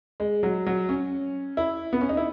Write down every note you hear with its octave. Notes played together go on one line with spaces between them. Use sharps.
G#3
F#3
F#3
C#4
E4
B3
C#4
D#4
E4